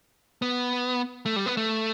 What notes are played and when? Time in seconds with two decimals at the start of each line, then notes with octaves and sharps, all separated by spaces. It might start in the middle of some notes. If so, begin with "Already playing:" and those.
0.42 B3
1.26 A3
1.36 G3
1.46 B3
1.57 A3